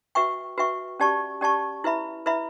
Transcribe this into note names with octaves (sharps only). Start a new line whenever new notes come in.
F#4 B4 E5 G5 C#6
F#4 B4 E5 G5 C#6
C#4 G4 D5 A5 C#6
C#4 G4 D5 A5 C#6
E4 B4 E5 B5
E4 B4 E5 B5